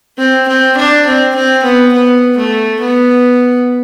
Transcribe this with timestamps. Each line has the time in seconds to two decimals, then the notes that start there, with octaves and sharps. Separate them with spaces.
0.18 C4
0.48 C4
0.77 D4
1.06 C4
1.35 C4
1.63 B3
1.93 B3
2.37 A3
2.80 B3